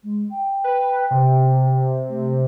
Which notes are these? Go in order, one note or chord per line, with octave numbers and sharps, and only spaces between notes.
G#3
G5
B4
C3
A3